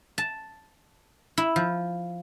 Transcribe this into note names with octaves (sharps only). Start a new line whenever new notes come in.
A5
E4
F3